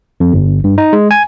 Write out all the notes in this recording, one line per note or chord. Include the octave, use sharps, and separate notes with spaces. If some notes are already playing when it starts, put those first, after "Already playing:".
F2
G1
G2
D#4
G#3
G#5